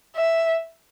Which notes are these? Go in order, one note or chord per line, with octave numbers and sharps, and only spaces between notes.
E5